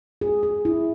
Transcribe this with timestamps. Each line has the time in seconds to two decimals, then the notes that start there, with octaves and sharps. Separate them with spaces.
0.21 G#4
0.43 G#4
0.65 E4